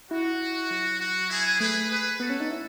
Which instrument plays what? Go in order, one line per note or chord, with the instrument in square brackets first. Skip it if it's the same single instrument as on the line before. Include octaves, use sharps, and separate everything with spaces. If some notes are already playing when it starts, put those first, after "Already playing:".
[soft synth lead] E4 [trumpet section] F#4
[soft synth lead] F#3
[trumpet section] F#4
E4 G#4
[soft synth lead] A3 [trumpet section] G#4 B4
[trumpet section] G#4 B4
[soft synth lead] B3 [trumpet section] F#4 A4
[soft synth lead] C#4
D#4
E4